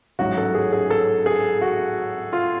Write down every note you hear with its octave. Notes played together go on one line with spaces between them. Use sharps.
A1 G#2 F#3 C#4 F#4
A4
G#4
G#4
A4
G#4
F#4
F4